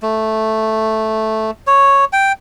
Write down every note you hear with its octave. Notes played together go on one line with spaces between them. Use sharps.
A3
C#5
G5